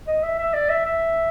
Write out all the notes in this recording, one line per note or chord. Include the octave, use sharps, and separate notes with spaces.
D#5
E5
E5
D5
E5
E5